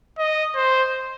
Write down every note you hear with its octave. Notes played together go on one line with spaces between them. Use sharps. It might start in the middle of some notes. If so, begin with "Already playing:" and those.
D#5
C5